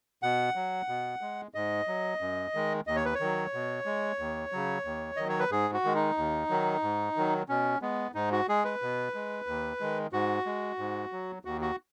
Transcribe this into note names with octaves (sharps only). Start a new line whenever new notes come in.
B2 F#5
F#3
B2
G#3
G#2 D#5
F#3
F#2
D#3 G#3
D#2 D#5
C#5
B4
C#5
D#3 F#3
B2
G#3
D#2
C#3 F#3
D#2
D#3 F#3 D#5
C#5
B4
G#2 G#4
F#4
D#3 G#3
D#4
D#2
D#3 F#3
G#2
D#3 F#3
B2 C#4
G#3 B3
G#2 D#4
F#4
G#3 G#4
B4
B2
G#3
D#2
D#3 G#3
G#2 F#4
G#3
G#2
F#3
D#2 F#4
F#4